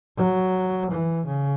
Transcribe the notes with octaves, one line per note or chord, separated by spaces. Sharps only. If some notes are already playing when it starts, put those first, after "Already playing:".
F#3
E3
C#3